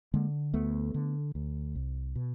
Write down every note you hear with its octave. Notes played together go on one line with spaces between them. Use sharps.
D3 G#3 A#3
D2 A3 B3
D3
D2
C2
B2